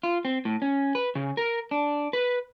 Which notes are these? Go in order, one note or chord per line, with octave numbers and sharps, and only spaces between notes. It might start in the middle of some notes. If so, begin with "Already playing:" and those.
F4
C4
A2
C#4
B4
C#3
A#4
D4
B4